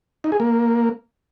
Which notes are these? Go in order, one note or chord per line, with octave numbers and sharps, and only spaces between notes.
D#4
G#4
A#3